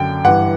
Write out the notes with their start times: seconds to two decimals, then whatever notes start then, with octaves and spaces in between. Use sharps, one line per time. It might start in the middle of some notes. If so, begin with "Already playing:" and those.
Already playing: F#2 D3 G5
0.24 G2 E3 F#5